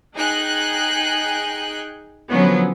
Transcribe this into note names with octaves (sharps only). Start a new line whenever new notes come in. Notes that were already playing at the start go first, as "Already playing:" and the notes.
D#4 G#4 G5 F#6
D3 F3 F#3 B3 C#4